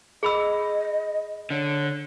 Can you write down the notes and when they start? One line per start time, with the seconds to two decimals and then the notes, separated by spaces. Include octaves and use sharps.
0.23 G#4 D#5 B5 E6
1.50 D3 C#5